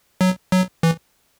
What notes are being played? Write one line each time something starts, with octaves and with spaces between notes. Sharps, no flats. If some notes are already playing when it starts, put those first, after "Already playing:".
F#3
F#3
E3